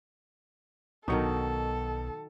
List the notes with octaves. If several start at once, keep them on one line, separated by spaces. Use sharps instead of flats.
B1 B2 D#3 F#3 D#4 A4 C#6 C#7